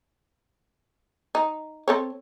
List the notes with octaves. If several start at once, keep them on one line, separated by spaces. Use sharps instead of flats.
D#4
C4 A4 C#5